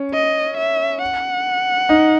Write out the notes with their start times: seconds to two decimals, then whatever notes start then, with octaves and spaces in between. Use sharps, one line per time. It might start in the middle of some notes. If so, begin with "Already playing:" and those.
Already playing: C#4
0.14 D#5
0.57 E5
1.02 F#5
1.89 D#4